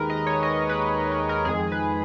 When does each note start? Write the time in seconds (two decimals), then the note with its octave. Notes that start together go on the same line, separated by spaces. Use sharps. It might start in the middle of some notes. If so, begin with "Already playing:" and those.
Already playing: D#2 D#3 G#3 A#4 B4
0.10 D#5
0.27 C#5
0.43 D#5
0.69 B4
1.11 B4
1.29 A#4
1.45 F2 D#3 G#3 G#4
1.72 B4